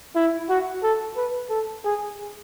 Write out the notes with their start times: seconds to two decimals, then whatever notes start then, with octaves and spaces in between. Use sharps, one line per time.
0.16 E4
0.50 F#4
0.83 A4
1.17 B4
1.50 A4
1.85 G#4